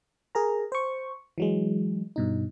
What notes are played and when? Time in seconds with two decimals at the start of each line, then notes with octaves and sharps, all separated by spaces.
0.35 G#4 A#4 A#5
0.72 C5 C#6
1.38 E3 F#3 G#3
2.16 G2 B2 D#4